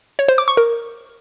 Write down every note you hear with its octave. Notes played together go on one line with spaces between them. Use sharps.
C#5
C5
D6
C#6
A#4